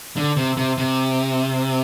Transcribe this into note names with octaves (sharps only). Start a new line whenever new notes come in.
D3
C3
C3
C3